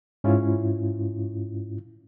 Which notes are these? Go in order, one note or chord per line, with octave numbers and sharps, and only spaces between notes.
G#2 C#4 E4 F4